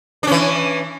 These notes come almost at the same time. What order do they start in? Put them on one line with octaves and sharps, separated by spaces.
D4 C#4 E3